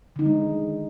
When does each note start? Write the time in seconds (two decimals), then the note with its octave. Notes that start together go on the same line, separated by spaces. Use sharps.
0.16 D3
0.19 D#4
0.22 D#3
0.25 G#3